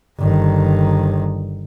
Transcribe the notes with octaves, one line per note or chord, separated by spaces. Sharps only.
G1 D#3